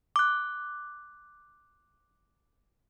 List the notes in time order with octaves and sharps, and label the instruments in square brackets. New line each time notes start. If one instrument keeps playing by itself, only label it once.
[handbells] D6 F#6